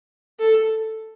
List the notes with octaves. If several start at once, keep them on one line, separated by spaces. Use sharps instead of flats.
A4